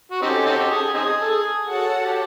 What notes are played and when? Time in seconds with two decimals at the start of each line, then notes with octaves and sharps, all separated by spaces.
0.11 F#4
0.22 C4 C#4 D#4 F#4 G4 A4
0.46 C4 D#4 G4
0.71 G#4
0.94 C4 D#4 G#4
1.21 A4
1.31 G#4
1.68 F#4 A4 C#5 F#5 A5
2.04 G4